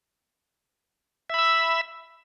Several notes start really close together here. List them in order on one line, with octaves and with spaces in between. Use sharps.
E5 B5 E6